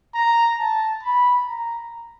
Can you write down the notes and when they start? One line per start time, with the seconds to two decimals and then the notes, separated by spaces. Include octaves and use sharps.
0.15 A#5
0.59 A5
1.03 B5
1.47 A#5